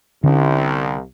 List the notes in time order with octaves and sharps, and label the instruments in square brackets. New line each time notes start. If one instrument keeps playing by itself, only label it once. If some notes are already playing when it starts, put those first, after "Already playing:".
[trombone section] C2 [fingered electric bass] D3 C#4